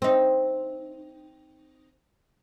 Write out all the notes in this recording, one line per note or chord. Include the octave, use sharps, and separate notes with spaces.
C4 D#4